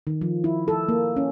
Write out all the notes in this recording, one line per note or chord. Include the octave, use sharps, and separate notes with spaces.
D#3
F3
E4
A4
A#3
C#4